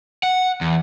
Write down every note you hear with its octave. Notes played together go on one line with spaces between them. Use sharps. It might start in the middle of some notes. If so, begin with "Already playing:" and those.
F#5
E2